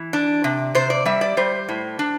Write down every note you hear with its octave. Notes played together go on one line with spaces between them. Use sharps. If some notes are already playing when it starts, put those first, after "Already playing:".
Already playing: E3
D4
C3
C3 C5
D5
G3 E5
D5
G3 C5
A2
D4